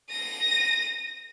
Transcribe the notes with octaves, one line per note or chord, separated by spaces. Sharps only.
A#6 D#7